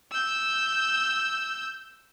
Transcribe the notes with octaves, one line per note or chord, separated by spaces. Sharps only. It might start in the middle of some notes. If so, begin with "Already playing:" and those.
E6 G6